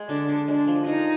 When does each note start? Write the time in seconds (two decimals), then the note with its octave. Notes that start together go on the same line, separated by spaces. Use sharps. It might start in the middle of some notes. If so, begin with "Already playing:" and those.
Already playing: G#3
0.09 D3 D4
0.29 D3
0.48 G#3 D4
0.68 F3
0.86 G#3 D#4